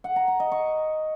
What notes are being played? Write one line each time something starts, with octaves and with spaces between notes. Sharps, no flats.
F#5
A#5
A#5
D#5
C#6